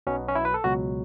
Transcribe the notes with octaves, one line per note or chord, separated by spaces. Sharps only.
B1 B2 F#3 B3 C#4
C#4
E4
B4
A4
C#2 B2 F#3 F#4